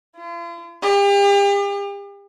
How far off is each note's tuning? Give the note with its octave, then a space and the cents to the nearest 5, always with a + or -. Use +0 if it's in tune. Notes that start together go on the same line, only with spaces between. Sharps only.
F4 -45
G4 +40